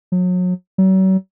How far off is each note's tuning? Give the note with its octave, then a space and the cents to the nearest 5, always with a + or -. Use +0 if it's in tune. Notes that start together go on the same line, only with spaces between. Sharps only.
F#3 -35
F#3 +40